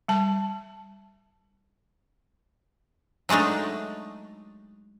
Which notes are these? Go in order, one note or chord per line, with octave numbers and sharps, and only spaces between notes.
G3 A5
F#3 G#3 A3 D4 D#4